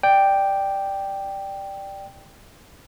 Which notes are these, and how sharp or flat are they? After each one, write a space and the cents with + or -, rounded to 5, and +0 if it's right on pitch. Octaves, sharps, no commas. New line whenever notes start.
D5 +10 G5 +0